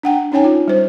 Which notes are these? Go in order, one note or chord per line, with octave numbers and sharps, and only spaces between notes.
D4 F#5 G5
C#4 D#4 C#5 G5 G#5
F4
G3 C5